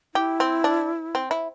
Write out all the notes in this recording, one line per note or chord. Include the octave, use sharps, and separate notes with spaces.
E4 G4
C4
D4
C4
E4